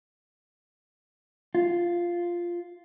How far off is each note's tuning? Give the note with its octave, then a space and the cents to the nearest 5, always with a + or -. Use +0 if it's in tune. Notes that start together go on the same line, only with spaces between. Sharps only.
F4 -5